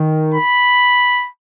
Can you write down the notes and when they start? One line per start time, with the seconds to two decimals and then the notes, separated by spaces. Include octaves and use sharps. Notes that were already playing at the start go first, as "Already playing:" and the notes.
Already playing: D#3
0.34 B5